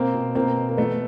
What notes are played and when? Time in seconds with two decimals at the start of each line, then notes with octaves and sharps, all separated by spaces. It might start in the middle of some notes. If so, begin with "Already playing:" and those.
Already playing: B2 A#3 C4
0.14 B2
0.35 B2 A#3 C4
0.57 B2
0.69 A#3
0.77 E3 A3 B3